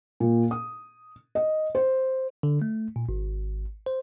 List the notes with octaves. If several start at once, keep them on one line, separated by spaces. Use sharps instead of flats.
A#2
D#6
D#5
C5
D3
A3
A#2
G#1
C5